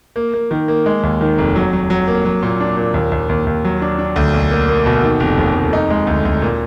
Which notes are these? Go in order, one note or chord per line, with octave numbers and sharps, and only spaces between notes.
A#3
A#3
D#3
A#3
G#3
D#2
D#3
F1
F#3
F#3
F#3
A#3
F#3
A#2
D4
A#2
D#2
D#2
D#2
D#2
F#3
D4
D4
D2
B1
A#3
A#3
B2
D#3
F1
D#2
F1
D#4
G#3
D2
D2
A#2